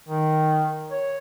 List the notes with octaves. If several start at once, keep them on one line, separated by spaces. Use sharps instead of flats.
D#3
C#5